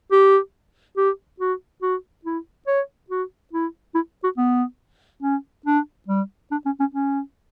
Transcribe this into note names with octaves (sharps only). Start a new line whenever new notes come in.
G4
G4
F#4
F#4
E4
C#5
F#4
E4
E4
F#4
B3
C#4
D4
G3
D4
C#4
C#4
C#4